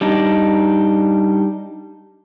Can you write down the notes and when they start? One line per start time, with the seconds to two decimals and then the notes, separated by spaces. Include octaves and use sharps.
0.01 G3 D4 D#4